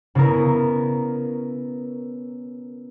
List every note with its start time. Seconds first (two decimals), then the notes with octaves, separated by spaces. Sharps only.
0.15 C#3 B3 E4 A#4